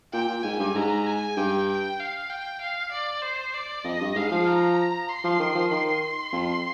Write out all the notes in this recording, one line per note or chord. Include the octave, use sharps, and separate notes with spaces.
A#2 G5
A#2
G#2 G#5
G2
G#2 A#5
G#5
G2 G5
G5
F5
G5
F5
D5
C5
D5
F2 D#5
G2
G#2 F5
F3
A#5
C6
F3
D#3
F3
D#3 C6
F2